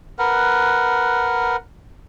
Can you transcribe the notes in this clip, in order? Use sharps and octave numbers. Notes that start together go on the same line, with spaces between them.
A#4 B4 F#5